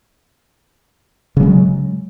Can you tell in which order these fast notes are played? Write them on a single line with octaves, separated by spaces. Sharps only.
C#3 F#3 G#3